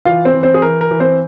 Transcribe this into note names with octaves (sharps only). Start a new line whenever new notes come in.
E3 F4 F5
C4 C5
E3
C4 C5
G#4
E3 A#4
A#4
E3
C4 C5